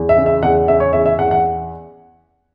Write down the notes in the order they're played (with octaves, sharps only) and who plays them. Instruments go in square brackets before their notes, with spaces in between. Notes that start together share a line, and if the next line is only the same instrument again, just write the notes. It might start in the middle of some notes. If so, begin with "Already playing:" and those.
Already playing: [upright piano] E2
E5
C#3
E5
E2 F#5
C#3 E5
C#5
E2 E5
E5
E2 F#5
F#5